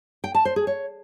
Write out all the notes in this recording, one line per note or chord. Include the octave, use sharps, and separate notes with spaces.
G5
A5
C5
G#4
C#5